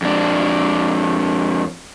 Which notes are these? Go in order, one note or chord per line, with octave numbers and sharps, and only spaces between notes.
F2 D4